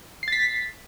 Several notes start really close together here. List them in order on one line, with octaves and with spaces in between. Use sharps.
C7 A6 B6